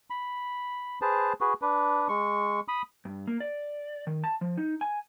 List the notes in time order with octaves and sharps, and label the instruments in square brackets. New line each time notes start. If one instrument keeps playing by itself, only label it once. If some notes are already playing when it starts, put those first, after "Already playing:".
[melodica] B5
G#4 B4 C5 A5
F#4 G#4 B4
D4 B4
G#3 C#6
B5 D#6
[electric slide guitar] G2
A#3
D5
D#3
A5
F3
D#4
G#5